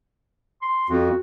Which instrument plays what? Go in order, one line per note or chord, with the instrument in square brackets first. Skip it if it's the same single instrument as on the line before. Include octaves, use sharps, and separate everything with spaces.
[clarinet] C6
[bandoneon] F2 [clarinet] F#4